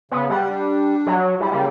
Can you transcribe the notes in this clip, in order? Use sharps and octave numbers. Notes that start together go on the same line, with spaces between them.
C#3 B3
G3 F#5
D4
F#3
G3 E4
C#3 G3 A#3